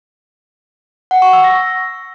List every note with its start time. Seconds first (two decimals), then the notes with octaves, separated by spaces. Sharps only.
1.11 F#5
1.22 C#6
1.33 E6
1.44 A#6